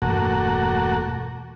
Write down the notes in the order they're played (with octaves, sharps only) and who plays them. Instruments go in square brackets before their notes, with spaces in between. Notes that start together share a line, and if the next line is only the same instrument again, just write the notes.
[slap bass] E1 G2 [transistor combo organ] A3 A#3 F#4